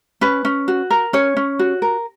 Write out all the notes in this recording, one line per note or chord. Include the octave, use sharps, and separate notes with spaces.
C#4 B4
C#4
F#4
A#4
C#4 C#5
C#4
F#4
A#4